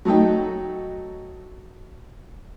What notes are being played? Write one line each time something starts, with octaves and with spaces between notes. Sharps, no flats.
F#3 A3 D#4 G5